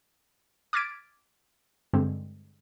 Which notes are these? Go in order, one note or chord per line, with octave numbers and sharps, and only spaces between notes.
D6 F6 G#6 A6 B6 D7
G2 D3 G#3 C4